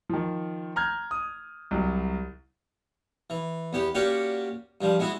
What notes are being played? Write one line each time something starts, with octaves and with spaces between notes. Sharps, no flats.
D#3 F3
A#5 F6 G6 G#6
D#6
C2 F#3
E3
E2 B3 G4
A#2 C#4 F#4 G4 D5 C#6
G2 F3 G3
G#3 B3 E4 F#4